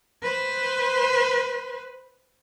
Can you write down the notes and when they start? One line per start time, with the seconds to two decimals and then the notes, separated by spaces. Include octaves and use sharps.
0.23 B4 C5